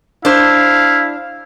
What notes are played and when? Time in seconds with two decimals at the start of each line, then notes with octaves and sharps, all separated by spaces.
0.25 D4 E4 C5 F5